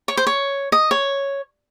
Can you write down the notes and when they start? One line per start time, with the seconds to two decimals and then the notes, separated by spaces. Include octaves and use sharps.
0.08 C#5
0.17 C5
0.27 C#5
0.72 D#5
0.91 C#5